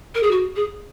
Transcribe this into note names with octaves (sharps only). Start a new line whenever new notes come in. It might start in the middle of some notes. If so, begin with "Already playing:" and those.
A#4
G#4
F#4
G#4